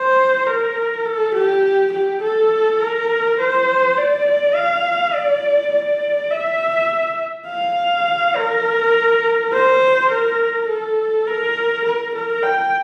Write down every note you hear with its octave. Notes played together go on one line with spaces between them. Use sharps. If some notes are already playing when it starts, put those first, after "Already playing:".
Already playing: C5
A#4
A4
G4
G4
A4
A#4
C5
D5
F5
D5
D5
E5
F5
A#4
C5
A#4
A4
A#4
A#4
A#4
G5